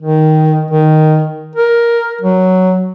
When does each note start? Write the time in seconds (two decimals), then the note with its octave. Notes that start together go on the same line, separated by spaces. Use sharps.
0.01 D#3
0.71 D#3
1.56 A#4
2.22 F#3